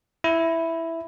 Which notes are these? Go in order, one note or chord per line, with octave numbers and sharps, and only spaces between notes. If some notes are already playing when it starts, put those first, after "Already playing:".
E4